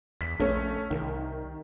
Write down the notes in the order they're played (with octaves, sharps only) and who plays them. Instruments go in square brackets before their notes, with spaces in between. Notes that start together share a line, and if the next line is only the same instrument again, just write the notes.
[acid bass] E2 [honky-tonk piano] B6
[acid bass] A#1 [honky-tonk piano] A3 C#4
[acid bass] C2 [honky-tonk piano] D#3